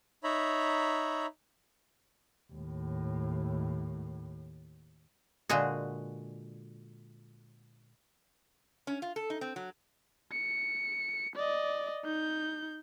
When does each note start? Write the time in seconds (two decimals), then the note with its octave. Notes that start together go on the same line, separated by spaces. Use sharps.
0.24 D#4 C#5 E5 A#5 B5
2.53 D#2 A2
5.49 A#2 D3 G#3 F#4 G#4
8.87 C#4
9.02 F4
9.16 A4
9.30 D#4
9.41 C4
9.56 F#3
10.32 C#7
11.36 D5 D#5
12.05 D#4 G6